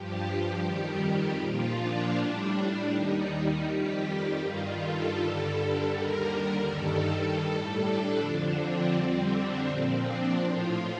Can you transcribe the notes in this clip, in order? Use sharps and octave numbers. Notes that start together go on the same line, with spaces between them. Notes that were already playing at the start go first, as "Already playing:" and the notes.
Already playing: G2 F3 G4
F2 D#3 G3
A#2 F3 F4
D4
A2 G3
D#2 D#3 G3 D#4
D#4
F2 D#3 G3 G4
G4
G2 D#3 G3 F4
A4
G2 D3 G3 A4
D#2 D3 G3 A#4
G2 D#3 G3 A4
A2 G3
D4
F2 D3 F3
C4
F2 D3 G3
D4
A#2 F3 C4
D4
A2 F3 F4